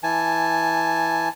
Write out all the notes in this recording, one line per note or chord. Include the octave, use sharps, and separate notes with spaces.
E3 G#5 A5